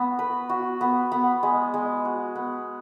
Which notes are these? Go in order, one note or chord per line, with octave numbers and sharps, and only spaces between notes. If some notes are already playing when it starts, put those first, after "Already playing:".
Already playing: B3 F#4
B4
F#4
B3
B3
G#3
G#3
F#4
B3